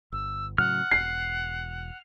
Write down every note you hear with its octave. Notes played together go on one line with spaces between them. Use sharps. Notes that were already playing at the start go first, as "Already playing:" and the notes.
G1 E6
A2 C#3 F#3 F#5 F6
E1 C7